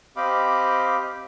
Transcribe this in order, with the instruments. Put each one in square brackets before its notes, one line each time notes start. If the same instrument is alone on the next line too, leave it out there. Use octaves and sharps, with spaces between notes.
[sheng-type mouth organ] C4 G4 D#5 F5 B5 D6